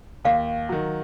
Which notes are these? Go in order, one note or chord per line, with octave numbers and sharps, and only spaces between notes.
D#2 F5
D#3 F#3